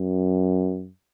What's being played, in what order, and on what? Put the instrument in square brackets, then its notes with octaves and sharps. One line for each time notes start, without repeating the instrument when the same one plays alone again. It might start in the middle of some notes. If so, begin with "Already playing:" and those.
Already playing: [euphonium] F#2